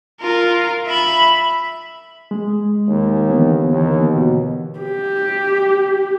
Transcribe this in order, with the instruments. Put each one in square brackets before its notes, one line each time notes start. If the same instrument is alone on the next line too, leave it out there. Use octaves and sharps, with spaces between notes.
[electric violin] F4 A#4
E5 B5
[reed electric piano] G#3
[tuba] D#2
[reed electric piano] D3 E3 B3
[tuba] D#2
B2
[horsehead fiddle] G4